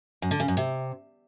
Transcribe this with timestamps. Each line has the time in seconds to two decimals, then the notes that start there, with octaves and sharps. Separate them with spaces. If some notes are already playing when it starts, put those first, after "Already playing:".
0.22 F#2
0.31 D3
0.40 C#3
0.48 F#2
0.57 C3